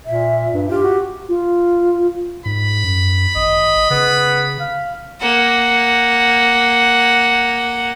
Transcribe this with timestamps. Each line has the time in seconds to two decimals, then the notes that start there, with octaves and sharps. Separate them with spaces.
0.06 A#2 E5
0.53 G2
0.70 F4 G4
0.83 F#4
1.29 F4
2.46 G#2 B5
2.84 F#2
3.35 G#1 D#5
3.90 C#3 B3
4.60 F5
5.20 A#3 F#5